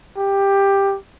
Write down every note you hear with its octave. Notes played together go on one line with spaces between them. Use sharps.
G4